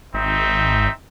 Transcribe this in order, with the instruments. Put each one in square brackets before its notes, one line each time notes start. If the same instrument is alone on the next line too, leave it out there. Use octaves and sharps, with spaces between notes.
[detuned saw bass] G#1 [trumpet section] C4 D#4 E5